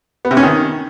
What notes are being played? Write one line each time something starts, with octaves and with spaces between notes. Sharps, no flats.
B3
C3
C#4
D#3